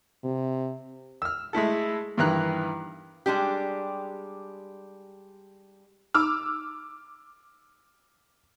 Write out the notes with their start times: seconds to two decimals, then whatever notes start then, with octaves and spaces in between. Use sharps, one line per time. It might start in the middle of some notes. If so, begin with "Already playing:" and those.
0.24 C3
1.22 E6 F6
1.53 G#3 A3 E4 A4
2.18 G2 D#3 E3 A#5 F#6
3.26 G3 G#3 D4 G4
6.14 D#4 B5 D6 E6 F6